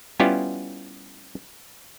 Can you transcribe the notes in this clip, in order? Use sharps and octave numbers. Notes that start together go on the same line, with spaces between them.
G3 B3 C#4 E4 F4 G4